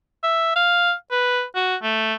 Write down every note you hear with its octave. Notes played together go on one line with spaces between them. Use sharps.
E5
F5
B4
F#4
A3